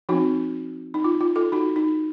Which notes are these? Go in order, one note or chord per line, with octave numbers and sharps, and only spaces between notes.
F3 C4 D#4 F#4
D#4
F4
F4
F4 A4
D#4 F#4
D#4